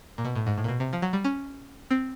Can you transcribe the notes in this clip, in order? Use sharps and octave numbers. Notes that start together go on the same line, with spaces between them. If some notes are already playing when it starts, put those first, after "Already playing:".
A#2
B2
A2
G#2
A2
A#2
B2
C3
F3
F#3
G3
C#4
C4